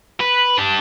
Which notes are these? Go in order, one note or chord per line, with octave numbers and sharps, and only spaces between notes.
B4
D4 G4